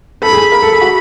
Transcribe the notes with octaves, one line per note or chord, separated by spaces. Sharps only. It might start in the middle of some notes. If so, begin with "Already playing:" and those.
A4 B5
G#4
A#4 B5
A4
G#4
F#4